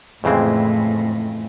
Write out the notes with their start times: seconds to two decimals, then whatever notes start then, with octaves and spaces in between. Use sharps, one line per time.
0.24 F2 A2 C#3 E3 G#3 C4